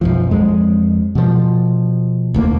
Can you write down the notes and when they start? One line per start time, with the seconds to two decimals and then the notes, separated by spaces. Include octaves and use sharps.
0.01 B1 F#2 F3
0.31 F2 G#3
1.15 B2 F3
2.34 E1 D2 A#3